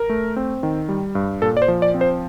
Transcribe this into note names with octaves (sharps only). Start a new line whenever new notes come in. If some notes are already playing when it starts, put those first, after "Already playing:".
Already playing: A#4
A3
C4
D#3
G3
G2
A#2 A4
D5
C5
F3
D5
C4
C5